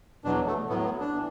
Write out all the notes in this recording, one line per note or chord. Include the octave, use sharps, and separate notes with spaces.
E2 B2 F#3 D4
A3
A2 F#3 B3
B3
D4
E3